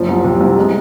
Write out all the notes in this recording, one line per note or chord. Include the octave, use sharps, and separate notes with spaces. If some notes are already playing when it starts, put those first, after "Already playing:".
Already playing: F#1 F3
C2
C3
C2
G#3